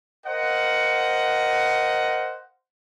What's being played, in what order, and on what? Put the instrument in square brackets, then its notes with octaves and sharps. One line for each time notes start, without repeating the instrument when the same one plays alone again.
[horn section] A#4 C5 D#5 F5 F#5